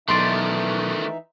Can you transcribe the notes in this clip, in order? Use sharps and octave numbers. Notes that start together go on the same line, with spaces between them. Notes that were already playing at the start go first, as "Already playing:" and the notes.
B1 D#3 E3 A3 D#4 D5 E5 C6